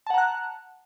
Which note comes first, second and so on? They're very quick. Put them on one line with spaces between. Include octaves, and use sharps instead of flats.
A5 F#5 A#5 F#6